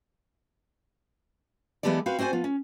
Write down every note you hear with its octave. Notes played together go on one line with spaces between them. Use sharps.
E3 G#3 B3 G4 A4 D5
C4 F#4 B4 F5
C4 F#4 C5 D5 G#5
F3 B3 F4
C#4